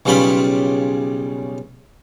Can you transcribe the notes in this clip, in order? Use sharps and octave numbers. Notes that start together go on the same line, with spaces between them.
B1 C#3 G3 C#4 F4 B5